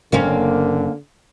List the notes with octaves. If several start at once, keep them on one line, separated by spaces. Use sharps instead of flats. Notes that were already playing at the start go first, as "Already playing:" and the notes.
F#1 D3 A#3 C4 C#4